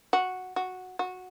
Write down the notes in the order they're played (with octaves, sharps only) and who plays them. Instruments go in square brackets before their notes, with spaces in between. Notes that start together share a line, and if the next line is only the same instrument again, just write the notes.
[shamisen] F#4
F#4
F#4